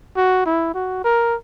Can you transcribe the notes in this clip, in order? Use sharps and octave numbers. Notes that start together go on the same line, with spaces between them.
F#4
E4
F#4
A#4